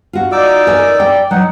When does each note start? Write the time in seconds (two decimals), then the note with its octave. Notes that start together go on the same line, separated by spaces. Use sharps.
0.13 F4 F#4
0.32 D#4 D5 D6 E6
0.67 A#4 G#5
1.00 G5
1.31 F#3 D#4 F#5